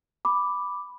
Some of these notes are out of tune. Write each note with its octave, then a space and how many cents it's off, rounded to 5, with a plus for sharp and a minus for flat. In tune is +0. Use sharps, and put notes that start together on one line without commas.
B5 +0 D6 +0